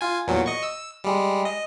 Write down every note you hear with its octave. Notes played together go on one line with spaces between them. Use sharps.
F4 G#5
E2 A#2 F#3
D#5 C#6
E6
G3 G#3
D#5